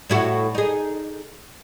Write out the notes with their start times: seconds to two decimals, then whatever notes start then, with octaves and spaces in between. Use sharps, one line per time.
0.10 A2 E4 F#4
0.55 D#4 G#4